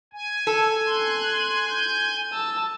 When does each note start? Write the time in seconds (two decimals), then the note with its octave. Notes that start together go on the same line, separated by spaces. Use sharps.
0.13 G#5
0.47 A4
0.88 C6 F#6
1.69 G6
2.33 A5 E6